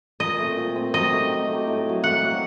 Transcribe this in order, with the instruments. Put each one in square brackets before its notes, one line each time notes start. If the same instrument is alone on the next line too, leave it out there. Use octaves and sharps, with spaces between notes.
[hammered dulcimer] A#2 [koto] D#5
[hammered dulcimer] A3 C4
A#2
A3 C4
[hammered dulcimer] F#3 [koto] D#5
[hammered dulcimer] A3 D#4 G4
F#3
A3 D#4 G4
A2
F#3 A#3
[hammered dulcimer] A2 [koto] F#5
[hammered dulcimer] F#3 A#3